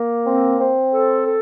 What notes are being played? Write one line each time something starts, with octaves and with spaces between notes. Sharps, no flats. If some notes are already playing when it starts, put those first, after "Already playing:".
Already playing: A#3
C4
C4
A4
A4